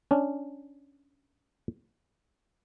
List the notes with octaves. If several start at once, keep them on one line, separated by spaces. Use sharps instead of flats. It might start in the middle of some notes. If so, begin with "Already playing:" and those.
C#4 D4